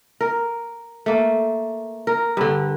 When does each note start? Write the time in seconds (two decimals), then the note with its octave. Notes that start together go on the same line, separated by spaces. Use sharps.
0.21 A#4
1.06 A3 A#3
2.07 A#4
2.37 G2 D3